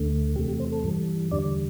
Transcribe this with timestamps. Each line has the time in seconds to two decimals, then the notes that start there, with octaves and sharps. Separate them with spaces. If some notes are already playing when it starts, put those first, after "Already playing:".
Already playing: D2 D3 A3
0.36 E2 C3 A3 G4
0.48 G4
0.60 C5
0.72 A4
0.84 G2 E3 G3
1.31 E2 D3 G3 D5